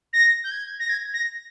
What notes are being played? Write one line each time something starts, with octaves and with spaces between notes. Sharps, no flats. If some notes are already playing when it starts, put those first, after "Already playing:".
A#6
G6
G#6
A#6
G#6
A#6